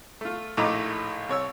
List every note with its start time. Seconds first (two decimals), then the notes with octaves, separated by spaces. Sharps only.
0.21 A3 F4
0.57 A#1 A2 A3 D#4 A#5 D6
1.29 C2 C#5 E6